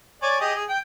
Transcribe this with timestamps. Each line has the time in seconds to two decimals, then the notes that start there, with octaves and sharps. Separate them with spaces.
0.22 C#5 D5 G#5
0.41 G4 G#4 D#5
0.55 G#4
0.69 G5